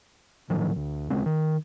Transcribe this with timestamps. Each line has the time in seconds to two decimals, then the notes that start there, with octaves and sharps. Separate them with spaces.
0.50 A2 D#3 F3 F#3
0.76 D2
1.10 C#2 C#3 G#3 C4
1.26 D#3